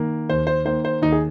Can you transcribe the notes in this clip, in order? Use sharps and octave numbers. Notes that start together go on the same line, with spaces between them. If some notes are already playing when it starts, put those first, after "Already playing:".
Already playing: D#3 A#3
D#2 C5
C5
D#3 A#3 C5
C5
D#2 D#4
G#4